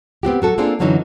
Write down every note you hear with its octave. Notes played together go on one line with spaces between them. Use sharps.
B3 C4 F#4 G4
F#3 F#4 A4
A#3 C4 D4 F4 G#4 A4
F#2 D3 E3 F#3 C#4 D#4